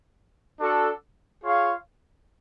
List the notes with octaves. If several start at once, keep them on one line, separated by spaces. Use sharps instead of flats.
D4 F#4 A4
F4 G#4 C#5 F5